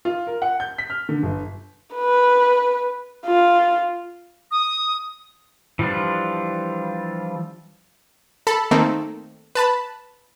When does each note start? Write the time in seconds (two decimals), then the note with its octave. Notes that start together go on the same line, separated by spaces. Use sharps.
0.05 F4
0.27 A#4
0.42 F#5
0.60 G6
0.78 B6
0.90 F6
1.09 D3
1.23 G1
1.96 B4
3.26 F4
4.51 D#6
5.79 E3 F3 G3 D4 F4
8.47 A4 A5 B5
8.71 D#3 A3 A#3 C4 D#4 A4
9.55 B4 A5 B5